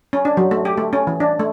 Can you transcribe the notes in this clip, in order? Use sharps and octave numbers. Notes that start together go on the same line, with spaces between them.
C#4
D4
F#3
A3
G4
A3
C#4
E3
D4
A3